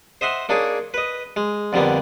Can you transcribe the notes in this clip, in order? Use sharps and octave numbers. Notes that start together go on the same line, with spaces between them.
C5 D#5 E5 F#5 C6
A#3 D4 D#4 G#4 C#5
B4 D#5
G#3
F2 D3 G3 A#3 B3